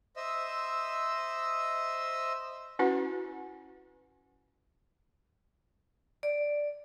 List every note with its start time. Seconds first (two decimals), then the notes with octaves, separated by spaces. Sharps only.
0.17 C5 D#5 E5 E6
2.79 C#4 E4 F#4 B4 F#5
6.23 D5